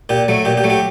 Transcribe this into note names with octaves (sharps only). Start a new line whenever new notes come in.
A#2 G4
F#3 A3
A#2 G4
G4
F#3 A3
G4